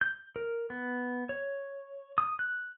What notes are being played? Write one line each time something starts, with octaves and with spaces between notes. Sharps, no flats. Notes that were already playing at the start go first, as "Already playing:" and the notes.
G6
A#4
B3
C#5
D#6
F#6